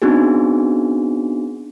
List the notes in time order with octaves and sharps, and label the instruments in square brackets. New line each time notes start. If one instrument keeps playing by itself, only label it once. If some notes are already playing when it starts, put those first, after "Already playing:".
[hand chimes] B3 C4 D4 D#4 F#4 G#4